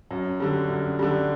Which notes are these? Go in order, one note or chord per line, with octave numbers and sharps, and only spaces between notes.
F#2
D3 G3
F#2
D3 G3